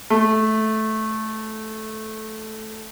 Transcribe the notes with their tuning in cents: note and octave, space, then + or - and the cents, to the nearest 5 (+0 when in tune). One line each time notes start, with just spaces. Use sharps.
A3 -10